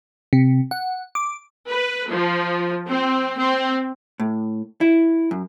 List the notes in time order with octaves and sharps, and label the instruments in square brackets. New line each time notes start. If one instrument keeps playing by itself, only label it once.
[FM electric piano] C3
F#5
D6
[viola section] B4
F3
C4
C4
[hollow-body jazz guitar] A2
E4
F#2